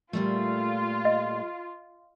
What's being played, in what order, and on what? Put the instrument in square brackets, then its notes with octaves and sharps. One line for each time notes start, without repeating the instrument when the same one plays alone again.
[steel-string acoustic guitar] A#2 G3 A3 [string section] F4
[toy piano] D#5